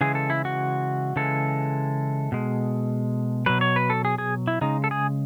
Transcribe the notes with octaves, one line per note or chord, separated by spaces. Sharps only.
C#3 E3 G#3 G#4
A4
E4
F#4
C#3 E3 G#3 A4
B2 G#3
B2 F#3 B4
C#5
B4
A4
G#4
G#4
E4
C#3 G#3 D#4
A4
G#4